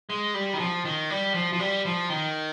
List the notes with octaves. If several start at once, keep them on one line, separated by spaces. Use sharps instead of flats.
G#3
G3
D#3
F3
D#3
G3
F3
F3
G3
F3
D#3